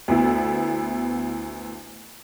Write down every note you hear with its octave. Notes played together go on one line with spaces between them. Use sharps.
D2 B3 E4